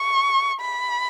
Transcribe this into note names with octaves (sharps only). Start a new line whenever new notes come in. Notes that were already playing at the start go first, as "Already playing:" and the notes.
Already playing: C#6
B5